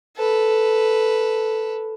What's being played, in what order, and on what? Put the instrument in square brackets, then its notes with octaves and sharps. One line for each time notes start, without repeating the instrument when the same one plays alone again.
[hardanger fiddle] A4 B4